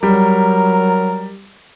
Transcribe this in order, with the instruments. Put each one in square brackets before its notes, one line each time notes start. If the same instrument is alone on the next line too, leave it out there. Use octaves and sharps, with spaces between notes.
[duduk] F#3 [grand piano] G3 [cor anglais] A#4